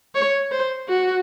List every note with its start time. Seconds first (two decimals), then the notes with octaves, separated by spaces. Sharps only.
0.15 C#5
0.51 C5
0.89 F#4